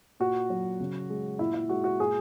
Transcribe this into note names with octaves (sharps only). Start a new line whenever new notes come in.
A#2 F#4
F#3
C#3
G#3
A#2 E4
E4
G#3 F#4
F#4
A#2 G#4